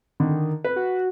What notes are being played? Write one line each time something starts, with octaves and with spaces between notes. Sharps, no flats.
D3 D#3
B4
F#4